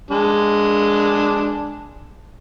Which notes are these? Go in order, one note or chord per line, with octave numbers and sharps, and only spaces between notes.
G#3 D4